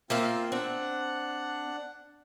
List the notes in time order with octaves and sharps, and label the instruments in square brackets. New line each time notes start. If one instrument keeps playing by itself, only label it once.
[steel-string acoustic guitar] A#3 E5 F5 [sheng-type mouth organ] C4 F4
[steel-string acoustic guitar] C4 [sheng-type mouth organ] D4 F#5